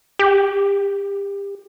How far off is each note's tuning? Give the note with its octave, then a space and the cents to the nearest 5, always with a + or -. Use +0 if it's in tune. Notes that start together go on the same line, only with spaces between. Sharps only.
G4 +30